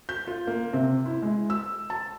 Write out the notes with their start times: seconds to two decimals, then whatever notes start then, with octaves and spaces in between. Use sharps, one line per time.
0.09 G6
0.27 F4
0.47 A#3
0.73 C3
1.06 E4
1.22 G#3
1.50 E6
1.90 A5